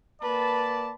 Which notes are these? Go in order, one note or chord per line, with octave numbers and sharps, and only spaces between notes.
A#3 B4 D5 A5